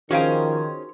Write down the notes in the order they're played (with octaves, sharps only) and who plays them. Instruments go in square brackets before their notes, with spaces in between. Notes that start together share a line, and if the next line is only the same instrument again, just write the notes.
[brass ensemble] D#3 [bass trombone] F3 [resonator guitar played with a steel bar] C#4 G#4 C5 [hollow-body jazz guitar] F#4 F5 G5